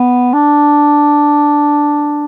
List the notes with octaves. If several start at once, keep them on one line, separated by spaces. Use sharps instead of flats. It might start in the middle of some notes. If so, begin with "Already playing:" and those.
Already playing: B3
D4